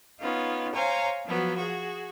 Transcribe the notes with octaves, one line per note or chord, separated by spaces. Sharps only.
B3 C#4 D#4 F4
C5 C#5 F5 G#5 A#5
F3 F#3 B3
F#4 G#4